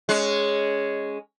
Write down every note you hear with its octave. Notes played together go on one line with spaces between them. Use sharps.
G#3 C#4